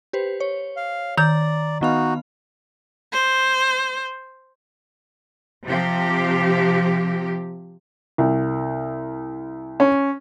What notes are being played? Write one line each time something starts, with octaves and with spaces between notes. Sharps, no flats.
G4 B4 C5
C#5
F5
D#3 D5 A#5 G6
D#3 B3 D#4 F#4 F5
C5
C3 F3 G4
C2
C#4